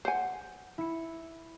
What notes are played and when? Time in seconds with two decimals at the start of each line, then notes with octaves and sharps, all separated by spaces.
0.05 C5 F#5 G#5 G6 C7
0.78 E4 C#7